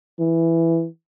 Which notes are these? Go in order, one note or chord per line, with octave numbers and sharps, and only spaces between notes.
E3